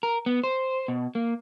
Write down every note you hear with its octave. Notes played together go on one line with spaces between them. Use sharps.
A#4
B3
C5
B2
A#3